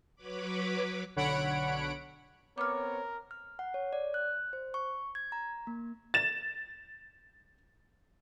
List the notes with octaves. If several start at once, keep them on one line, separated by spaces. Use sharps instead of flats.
F#3 B4 C#5 B5 D6
B1 D3 C#5 F#5 B5 D7
B3 C4 A#4 C#5 D6 F6
F6
F#5
C#5
D5
F#6
C5
C#6
G#6
A#5
A#3
A6 E7